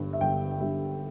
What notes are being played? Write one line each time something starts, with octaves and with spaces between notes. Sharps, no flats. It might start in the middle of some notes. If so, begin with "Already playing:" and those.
Already playing: G1 G2 G3
E5
G1 G5
G5
G2 G3 E5